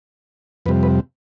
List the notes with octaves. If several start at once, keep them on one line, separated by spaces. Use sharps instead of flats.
F2 C3 G3 B4
B4